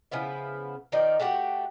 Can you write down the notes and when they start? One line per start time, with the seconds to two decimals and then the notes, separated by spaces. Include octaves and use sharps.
0.11 C#3 F3 B3 E4
0.92 D#3 F3 D#4 D5
1.20 A3 F#4 G4 F#5